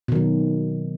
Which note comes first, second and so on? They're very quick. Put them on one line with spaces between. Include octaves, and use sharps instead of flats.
B2 D#3 F#3